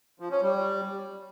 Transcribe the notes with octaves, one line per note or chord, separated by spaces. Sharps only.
F3
C#4
G3